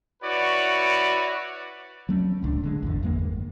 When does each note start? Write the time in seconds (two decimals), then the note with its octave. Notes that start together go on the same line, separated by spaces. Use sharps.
0.23 E4 F#4 B4 C#5 D5
2.09 F#3 A3 C#4
2.42 D1 C#2 D4
2.64 D3 G#3
2.83 G#1 E2 D3
3.03 G1 E2 G#3 A#3